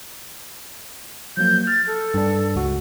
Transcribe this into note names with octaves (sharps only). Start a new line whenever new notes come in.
F3 F#3 A#3 G6
F6 A6
A4
G2 D4
C#2 F#4